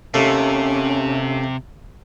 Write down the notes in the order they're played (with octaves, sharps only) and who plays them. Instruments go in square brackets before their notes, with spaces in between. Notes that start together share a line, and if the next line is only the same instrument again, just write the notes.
[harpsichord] D#2 A3 [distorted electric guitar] C3 [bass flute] C#4